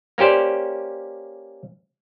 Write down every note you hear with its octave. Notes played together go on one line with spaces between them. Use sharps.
A#3 C#4 G4 C5 D5